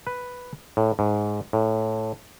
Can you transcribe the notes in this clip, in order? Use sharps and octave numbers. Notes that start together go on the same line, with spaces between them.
B4
A2
G#2
A2